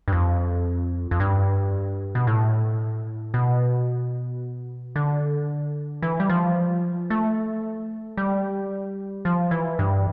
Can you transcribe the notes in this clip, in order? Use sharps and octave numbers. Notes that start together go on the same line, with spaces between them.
G2
F2
F2
G2
B2
A2
B2
D3
E3
G3
F3
A3
G3
F3
E3
G2